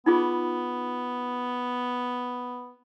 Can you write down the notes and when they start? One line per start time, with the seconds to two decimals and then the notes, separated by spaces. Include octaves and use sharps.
0.06 B3 D#4 F4 G#4